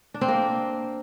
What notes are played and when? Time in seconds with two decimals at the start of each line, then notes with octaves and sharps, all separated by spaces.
0.14 D4
0.21 C4
0.28 A#3